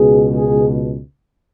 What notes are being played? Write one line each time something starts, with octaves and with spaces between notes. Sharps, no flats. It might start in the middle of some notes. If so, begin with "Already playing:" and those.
Already playing: C#2 B2 G#4
G#4